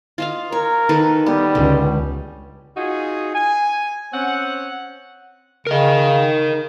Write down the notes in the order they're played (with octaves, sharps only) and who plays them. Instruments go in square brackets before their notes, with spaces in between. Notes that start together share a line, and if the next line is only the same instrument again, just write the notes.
[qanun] F4 D#5 F5
[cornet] A#4 [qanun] C#5
[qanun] D#3 A4 B4
[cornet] G3 [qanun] B3
[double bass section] C#2 [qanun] D3
[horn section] D#4 F4 F#4 G#4
G#5
C4 C#4 F#5
[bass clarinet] C#3 [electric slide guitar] A#4 D#5